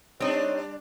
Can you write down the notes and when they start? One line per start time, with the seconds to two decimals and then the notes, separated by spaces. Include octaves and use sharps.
0.20 G3 C4 D4 D#4 C#5